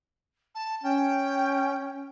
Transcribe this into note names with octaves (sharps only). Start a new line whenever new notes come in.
A5
C#4 G5